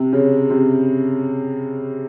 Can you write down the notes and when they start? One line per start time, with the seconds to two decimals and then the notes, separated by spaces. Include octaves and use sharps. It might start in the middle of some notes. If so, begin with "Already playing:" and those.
Already playing: C3
0.13 C#3
0.50 C3